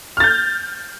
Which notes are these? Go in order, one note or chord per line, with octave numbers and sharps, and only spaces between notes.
F6 G6 A6